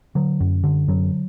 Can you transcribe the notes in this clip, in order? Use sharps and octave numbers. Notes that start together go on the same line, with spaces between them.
D3 F#3
F#2
D3
F#2 F#3